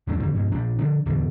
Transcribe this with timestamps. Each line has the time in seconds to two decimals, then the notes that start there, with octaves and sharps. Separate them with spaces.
0.07 E2 G#2 F#3 D4
0.20 F2 D3 E3 F3
0.33 G2 B2 F3 G#3
0.52 A#1 F3 D4
0.79 D3 F3 D4
1.06 D1 E2 B2 D3